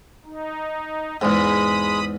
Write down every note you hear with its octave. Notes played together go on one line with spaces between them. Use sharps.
D#4
E2 G#2 G#3 B5 D#6